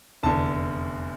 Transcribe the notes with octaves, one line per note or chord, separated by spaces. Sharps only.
F1 E2 D3 A5